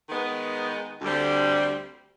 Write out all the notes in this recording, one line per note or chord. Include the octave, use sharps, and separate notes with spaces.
D#3 G#3 B3
D2 D3 G3 C4